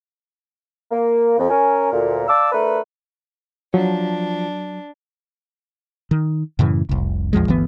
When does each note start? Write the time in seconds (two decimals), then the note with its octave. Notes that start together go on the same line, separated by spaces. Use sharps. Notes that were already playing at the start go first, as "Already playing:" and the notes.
0.91 A#3
1.39 F2
1.50 C#4 A#4 G#5
1.92 D2 A#2 A#4
2.28 D5 F5 A5 D6 E6
2.52 A3 D4 A#4 B4
3.74 F3 F#3 D4
6.11 D#3
6.59 F#2 A2 C#3 E3
6.89 F1 C2
7.33 A#1 E2 F3 G#3
7.48 G1 D2 E3 B3